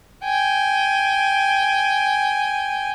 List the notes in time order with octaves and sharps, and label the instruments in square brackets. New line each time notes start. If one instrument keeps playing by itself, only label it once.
[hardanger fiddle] G5 G#5